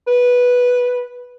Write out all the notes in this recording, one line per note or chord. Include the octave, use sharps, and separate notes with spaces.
B4